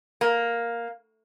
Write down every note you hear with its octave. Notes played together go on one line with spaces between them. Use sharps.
A#3